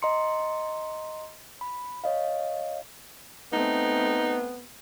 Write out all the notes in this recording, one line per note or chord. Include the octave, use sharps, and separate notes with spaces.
D#5 A#5 C6 C#7
B5
C#5 D#5 F5
A3 B3 C4 D#4